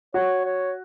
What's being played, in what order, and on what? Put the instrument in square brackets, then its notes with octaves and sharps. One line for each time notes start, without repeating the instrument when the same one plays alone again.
[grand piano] F#4 [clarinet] C#5
[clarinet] C#5